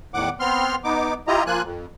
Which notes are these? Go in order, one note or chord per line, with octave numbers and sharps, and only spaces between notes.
E2 A2 D#3 F#5 D6
B3 C4 C6 F6
B3 D#4 D6
E4 F4 G4 D#5 A#5
F3 A#3 F4 G#5 F#6
F2